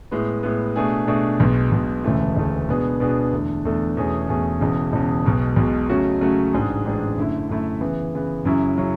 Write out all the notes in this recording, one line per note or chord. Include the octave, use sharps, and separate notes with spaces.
A2 G#3 B3
A2 G#3 B3
B2 A3 D4 G#4
B2 A3 D4 G#4
B1 B2 G#3
B1 B2 G#3
E1 D2 C#3 E3 A3
E1 D2 C#3 E3 A3
B2 G#3 B3 D4 G#4
B2 G#3 B3 D4 G#4
E2 D3 A3 D4 A4
E2 D3 A3 D4 A4
E2 B2 A3 C#4 G#4
E2 B2 A3 C#4 G#4
E1 E2 C#3
E1 E2 C#3
B1 B2 G#3
B1 B2 G#3
C#3 F#3 A3 C#4 F#4
C#3 F#3 A3 C#4 F#4
A1 G#2 G#3 D4 G#4
A1 G#2 G#3 D4 G#4
F#2 D3 A3 E4
F#2 D3 A3 E4
C#3 E3 B3
C#3 E3 B3
F#2 C#3 F#3 C#4 E4
C#3 F#3 C#4 E4